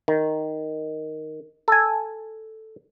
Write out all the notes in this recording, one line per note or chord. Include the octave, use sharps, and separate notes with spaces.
D#3
A4 G#5